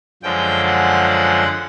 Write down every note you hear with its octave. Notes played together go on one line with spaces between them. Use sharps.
F#2 D3 F3 G#3 G5
F#5
F#5